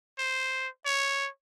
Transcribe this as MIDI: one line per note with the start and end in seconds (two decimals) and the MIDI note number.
0.19 0.68 72
0.86 1.28 73